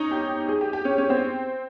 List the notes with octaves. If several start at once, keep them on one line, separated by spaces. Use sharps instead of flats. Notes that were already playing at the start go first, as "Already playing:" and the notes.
Already playing: C#4 D#4
G4
G#4
G4
G4
C#4
C#4
C4